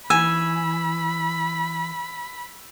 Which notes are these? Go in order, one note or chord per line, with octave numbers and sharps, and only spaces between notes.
E3 G#5 B5 E6